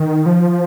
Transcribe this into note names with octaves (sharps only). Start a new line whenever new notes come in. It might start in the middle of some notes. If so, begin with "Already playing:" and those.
Already playing: D#3
F3